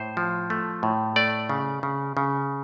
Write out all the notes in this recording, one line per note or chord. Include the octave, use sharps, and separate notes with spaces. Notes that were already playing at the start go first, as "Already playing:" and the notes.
Already playing: A2 C5
F3
A3
A2
A3 D5
C#3
C#3
C#3